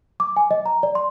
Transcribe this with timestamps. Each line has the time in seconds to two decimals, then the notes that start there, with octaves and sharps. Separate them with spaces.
0.20 D6
0.37 G#5
0.51 D#5
0.66 A#5
0.83 D5
0.95 C6